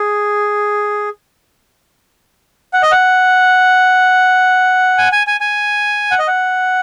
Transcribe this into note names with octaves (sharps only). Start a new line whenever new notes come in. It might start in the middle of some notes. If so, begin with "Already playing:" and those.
Already playing: G#4
F#5
D#5
F#5
G#5
G#5
G#5
G#5
F#5
D#5
F#5